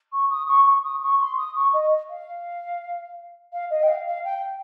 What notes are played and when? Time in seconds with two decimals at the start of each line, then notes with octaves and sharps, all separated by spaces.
0.13 C#6
0.30 D#6
0.48 C#6
0.66 C#6
0.84 D#6
1.03 C#6
1.20 C6
1.38 D#6
1.55 C#6
1.73 D#5
2.10 F5
3.53 F5
3.70 D#5
3.83 G5
3.88 F5
4.07 F5
4.25 G5